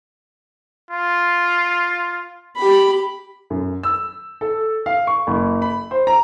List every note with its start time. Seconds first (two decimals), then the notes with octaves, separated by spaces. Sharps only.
0.91 F4
2.56 G4 B5
3.50 F#2
3.83 E6
4.41 A4
4.86 F5
5.07 C#6
5.27 F#1
5.62 B5
5.91 C5
6.07 A#5